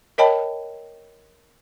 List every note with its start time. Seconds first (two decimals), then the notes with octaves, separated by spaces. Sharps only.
0.18 A#4 C#5 D#5 G5 A5 B5